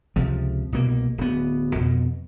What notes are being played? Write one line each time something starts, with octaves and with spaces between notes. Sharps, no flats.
C#2 C3 F3
C2 B2 A#3
D1 B3
F2 B2